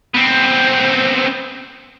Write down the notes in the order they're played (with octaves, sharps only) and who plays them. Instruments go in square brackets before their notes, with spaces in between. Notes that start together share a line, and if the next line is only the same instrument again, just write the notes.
[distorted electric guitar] B3 C4